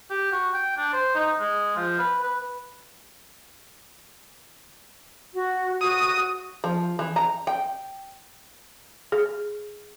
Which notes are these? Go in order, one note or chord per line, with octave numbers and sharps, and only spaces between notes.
G4
F#4
G5
D4
C5
D#4
G#3
F3
B4
B4
F#4
F#4 D#6
F3
E3
A#5
G5
G#4